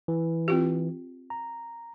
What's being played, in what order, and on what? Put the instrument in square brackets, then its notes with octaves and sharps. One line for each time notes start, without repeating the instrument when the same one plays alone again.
[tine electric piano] E3
[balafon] C4 F4 G4
[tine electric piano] A#5